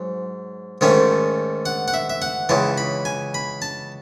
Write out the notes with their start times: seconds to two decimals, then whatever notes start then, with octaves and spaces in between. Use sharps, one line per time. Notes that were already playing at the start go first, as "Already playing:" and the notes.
Already playing: G#2 F#3
0.81 G#2 D#3 A3 C#4
1.66 F#5
1.88 F#5
1.94 E5
2.10 E5
2.22 F#5
2.49 C#2 C#3 E3 A5
2.78 B5
3.05 G#5
3.34 B5
3.62 A5